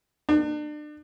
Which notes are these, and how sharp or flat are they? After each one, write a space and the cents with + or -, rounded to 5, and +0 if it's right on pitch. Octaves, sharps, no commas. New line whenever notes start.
D4 +35